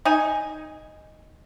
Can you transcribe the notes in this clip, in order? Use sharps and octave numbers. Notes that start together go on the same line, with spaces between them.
D#4 G#5